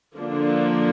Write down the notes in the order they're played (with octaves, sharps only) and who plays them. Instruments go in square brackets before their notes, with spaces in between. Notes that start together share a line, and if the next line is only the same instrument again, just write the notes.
[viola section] D3 F3 A#3 D4